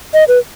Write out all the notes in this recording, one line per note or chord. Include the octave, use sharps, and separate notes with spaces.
D#5
B4